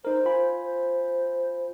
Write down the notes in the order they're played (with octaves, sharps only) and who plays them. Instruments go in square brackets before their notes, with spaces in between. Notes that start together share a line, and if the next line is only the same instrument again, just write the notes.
[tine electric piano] D#4 A#4 [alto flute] C5
[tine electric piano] F4 G#5 B5
[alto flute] C5